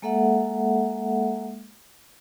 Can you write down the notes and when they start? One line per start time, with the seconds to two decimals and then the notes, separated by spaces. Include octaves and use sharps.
0.02 G#3 A#3 A4 E5 F#5